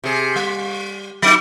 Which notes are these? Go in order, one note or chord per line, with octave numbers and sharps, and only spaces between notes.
C3 G#4
G3
F#3 D#4